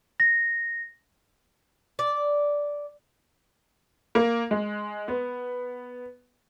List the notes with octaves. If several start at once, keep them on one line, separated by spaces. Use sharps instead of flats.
A#6
D5
A#3
G#3
B3